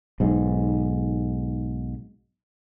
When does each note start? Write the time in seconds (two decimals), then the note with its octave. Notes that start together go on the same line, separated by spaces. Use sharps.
0.20 B1 G#2